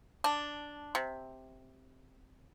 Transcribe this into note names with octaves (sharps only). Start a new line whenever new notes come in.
D4
C3